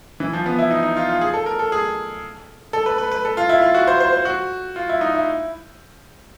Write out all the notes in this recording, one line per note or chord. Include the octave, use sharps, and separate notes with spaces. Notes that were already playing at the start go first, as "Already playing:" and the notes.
E3
F3
B3
E4
D#4
D#4
F4
F4
G#4
A4
A#4
A4
G#4
A4
B4
B4
B4
A4
F4
E4
F4
F#4
C5
C5
C5
F#4
F4
E4
D#4
E4